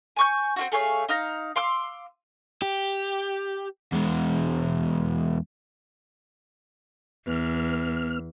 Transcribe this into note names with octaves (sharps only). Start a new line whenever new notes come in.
G#5 C#6 G6
C4 F4 F#4
A3 G#4 C#5 F5
D#4 F5 A#5
F5 C6 D6 E6
G4
E2 G#3
E2 B3 F6